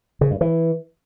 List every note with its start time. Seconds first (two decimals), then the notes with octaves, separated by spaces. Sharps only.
0.21 C#3
0.31 G2
0.41 E3